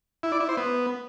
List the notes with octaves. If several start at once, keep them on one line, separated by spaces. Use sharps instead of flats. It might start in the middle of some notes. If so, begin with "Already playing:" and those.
E4
D5
E4
C5
B3